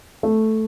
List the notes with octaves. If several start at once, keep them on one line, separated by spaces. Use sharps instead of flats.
A3